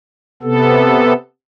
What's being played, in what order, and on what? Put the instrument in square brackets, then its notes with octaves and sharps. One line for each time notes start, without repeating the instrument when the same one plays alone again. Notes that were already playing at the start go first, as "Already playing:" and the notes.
[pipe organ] C3 B3 A4